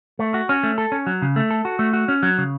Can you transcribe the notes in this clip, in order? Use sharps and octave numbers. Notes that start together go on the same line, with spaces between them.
A3
F#4
C#4
A3
A4
C#4
F#3
C#3
A3
A4
F#4
A3
F#4
C#4
F#3
C#3